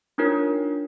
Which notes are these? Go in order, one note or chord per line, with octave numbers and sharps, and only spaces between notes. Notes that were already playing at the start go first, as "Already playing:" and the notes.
D4 D#4 F4 A#4 C#5